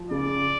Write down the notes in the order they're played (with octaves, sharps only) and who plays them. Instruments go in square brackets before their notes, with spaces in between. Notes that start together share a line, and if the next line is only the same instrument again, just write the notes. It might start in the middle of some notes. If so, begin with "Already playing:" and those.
Already playing: [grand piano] F3
[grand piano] C#3 [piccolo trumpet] D5